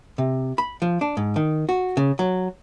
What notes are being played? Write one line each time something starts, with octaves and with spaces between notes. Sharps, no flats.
C3
B5
F3
D4
G#2
D#3
F#4
C#3
F#3